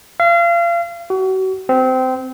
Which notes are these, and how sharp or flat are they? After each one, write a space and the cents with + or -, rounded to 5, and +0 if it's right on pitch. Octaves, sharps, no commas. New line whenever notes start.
F5 -35
F#4 +35
C4 -20